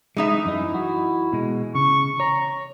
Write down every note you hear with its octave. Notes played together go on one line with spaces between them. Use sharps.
E3 G#3 D#4 E5
F#2 E4 D#5
F#4
B2 G#3
C#3 C#6
C#5 A#5